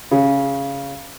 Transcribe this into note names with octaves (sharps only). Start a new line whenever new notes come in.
C#3